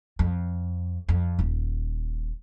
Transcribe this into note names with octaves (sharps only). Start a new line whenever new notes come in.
F2
F2
D#1